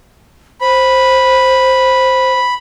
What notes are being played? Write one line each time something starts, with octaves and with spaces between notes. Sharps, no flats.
C5 B5